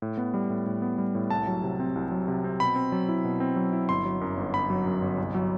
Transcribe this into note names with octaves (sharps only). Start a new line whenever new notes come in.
A2
B3
G3
A2
A2
B3
G3
A2
C2 A5
F#3
C3
C4
C2
F#3
C3
C4
B2 B5
C4
F#3
E4
B2
C4
F#3
E4
G1 C6
F#3
F#2
G1
G1 B5
F#3
F#2
G1
C2
F#3